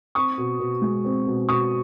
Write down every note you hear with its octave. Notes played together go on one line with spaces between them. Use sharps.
C4 C#6 D#6
B2
B2
G#3
C4
B2
B2 C#6 D#6